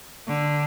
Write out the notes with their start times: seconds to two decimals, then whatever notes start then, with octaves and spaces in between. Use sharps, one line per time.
0.27 D3